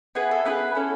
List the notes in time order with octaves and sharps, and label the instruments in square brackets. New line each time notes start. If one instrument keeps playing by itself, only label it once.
[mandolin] B3 E4 G#4 B4
A4
B3 E4 G#4 B4
C#4 E4 A4